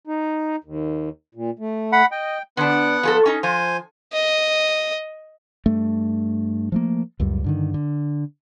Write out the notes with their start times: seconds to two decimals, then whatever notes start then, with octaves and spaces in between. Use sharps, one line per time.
0.07 D#4
0.64 D#2
1.35 A#2
1.59 A3
1.93 F#5 B5
2.12 D#5 G5
2.57 D3 B3 D4 F#5
3.03 F3 G#4 A4
3.26 C#4 D#4
3.43 F3 C5 G#5
4.13 D#5
5.66 G2 A3
6.72 F3 A3 A#3
7.20 C#2 F#2 G3
7.44 G2 D3 D#3
7.74 D3